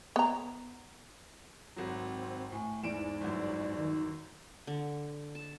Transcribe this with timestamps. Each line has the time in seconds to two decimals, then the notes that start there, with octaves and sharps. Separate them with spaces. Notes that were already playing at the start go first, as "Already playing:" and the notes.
0.16 B3 A#5
1.76 G#1 F#3 C4
2.52 A2 G#5
2.83 E2 G#2 D5 D7 E7
3.21 G1 F#2
3.78 D#3
4.67 D3
5.35 A5